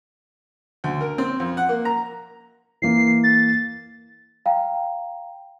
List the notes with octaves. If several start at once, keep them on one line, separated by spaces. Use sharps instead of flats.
D2
A#4
C4
F2
F#5
A#3
A#5
E3 A#3 C7
A6
F5 G5 A#5